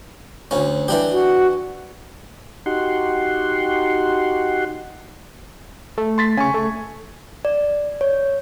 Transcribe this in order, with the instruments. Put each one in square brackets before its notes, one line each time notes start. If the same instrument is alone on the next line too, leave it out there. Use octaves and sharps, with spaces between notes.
[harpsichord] D2 C#4
E3 D4 G4
[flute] F#4
[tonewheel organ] D#4 F#4 G4 F#5 C6
[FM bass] A3
[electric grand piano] C6 A6 B6
[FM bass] C#3 [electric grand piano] G#5 C#6
[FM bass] A3
[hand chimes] D5
C#5